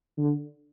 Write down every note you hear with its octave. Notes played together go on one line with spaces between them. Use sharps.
D3